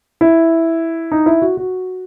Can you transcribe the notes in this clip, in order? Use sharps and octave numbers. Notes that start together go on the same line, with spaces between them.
E4
D#4
E4
F#4
F#4